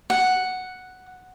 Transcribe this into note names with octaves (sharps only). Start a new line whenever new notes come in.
F#5